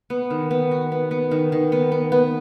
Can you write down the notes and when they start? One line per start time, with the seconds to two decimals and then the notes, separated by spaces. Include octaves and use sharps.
0.10 B3
0.30 D#3
0.51 B3
0.71 F#4
0.92 B3
1.11 B3
1.31 D#3
1.52 D#3
1.72 B3
1.92 B3
2.12 B3